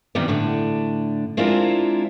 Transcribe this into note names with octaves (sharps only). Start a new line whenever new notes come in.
C3 D#3 E3 F#3 G3 B3
A2 D3 D4
G#3 C4 D4 E4 F4 A#4